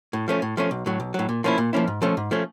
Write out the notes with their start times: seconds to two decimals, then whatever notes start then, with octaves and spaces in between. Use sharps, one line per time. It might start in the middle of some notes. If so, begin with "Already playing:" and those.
0.13 A2
0.28 F3 A3 C#4
0.42 A2
0.57 F3 A3 C#4
0.71 B1
0.86 A2 F#3
1.00 B1
1.14 A2 F#3
1.29 A#2
1.44 F3 A#3 C#4 E4
1.58 A#2
1.73 F3 A#3 C#4 E4
1.87 G#2
2.02 F3 A3 C#4
2.17 G#2
2.31 F3 A3 C#4